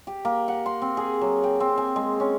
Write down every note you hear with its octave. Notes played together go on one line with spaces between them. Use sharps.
G4
A#3
F#5
C6
C4
G#4
F#3
G5
C4
G#5
G#3
C#4